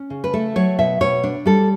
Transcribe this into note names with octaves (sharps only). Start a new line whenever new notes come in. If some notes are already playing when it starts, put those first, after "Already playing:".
Already playing: C#4
C#3
B4
A3 A4
F#3 C#5
B2 E5
B2 C#5
D4
G3 A4